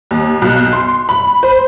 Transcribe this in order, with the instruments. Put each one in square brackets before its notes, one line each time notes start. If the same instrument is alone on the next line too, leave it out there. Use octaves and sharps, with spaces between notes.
[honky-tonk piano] D#2
B1
C6
B5
C5